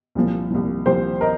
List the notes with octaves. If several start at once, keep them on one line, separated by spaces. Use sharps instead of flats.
C2 A#2 F3
C2 A#2 F3
C2 A#2 F3 G4 C5
A#4 D#5